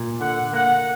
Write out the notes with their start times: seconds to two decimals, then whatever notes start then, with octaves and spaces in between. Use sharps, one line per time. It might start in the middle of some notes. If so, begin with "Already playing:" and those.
Already playing: A#2
0.21 D3 F#5
0.53 A#3 F#5